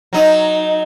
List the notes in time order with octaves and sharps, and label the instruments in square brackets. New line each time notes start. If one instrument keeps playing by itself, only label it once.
[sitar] F#3 D#4